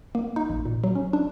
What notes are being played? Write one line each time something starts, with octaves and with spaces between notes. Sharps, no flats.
A#3
D#4
A1
A#2
F#3
C#4
D4